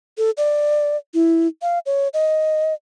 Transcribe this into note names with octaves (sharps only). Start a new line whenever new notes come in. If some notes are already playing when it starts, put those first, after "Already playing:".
A4
D5
E4
F5
C#5
D#5